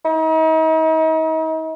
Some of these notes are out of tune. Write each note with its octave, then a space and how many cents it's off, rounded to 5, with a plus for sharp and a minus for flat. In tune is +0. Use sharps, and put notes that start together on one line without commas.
D#4 +40